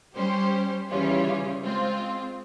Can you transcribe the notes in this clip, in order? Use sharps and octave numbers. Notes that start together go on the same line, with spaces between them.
G3 C#4 G4 C5
C#3 E3 G3 C#4 F4
G#3 C4 F4